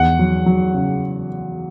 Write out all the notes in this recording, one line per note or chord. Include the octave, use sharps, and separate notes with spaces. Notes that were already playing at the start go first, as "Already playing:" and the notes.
Already playing: E2 F#5
F#3
F#3
C#3